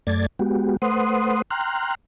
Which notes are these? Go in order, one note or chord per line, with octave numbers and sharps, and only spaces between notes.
F#2 A3 D5 G#6 A6
G#3 B3 F#4 G4
A3 B4 C5 F#5 C6 D#6
G5 A#5 C6 F6 F#6